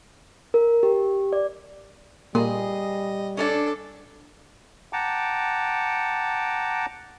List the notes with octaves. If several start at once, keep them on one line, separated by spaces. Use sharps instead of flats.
A#4
G4
D5
A#2 G3 G#4 D#5
C#4 D4 A4 D5
F#5 G5 A5 A#5 D6